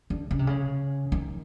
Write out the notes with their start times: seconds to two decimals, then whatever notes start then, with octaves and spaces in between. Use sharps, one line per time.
0.10 D3
0.31 C#3
0.39 C3
0.47 C#3
1.12 D#3